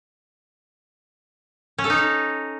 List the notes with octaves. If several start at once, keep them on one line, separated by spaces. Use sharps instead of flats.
C#4
A4
D#4